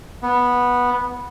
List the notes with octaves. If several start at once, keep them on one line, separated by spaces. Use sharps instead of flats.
B3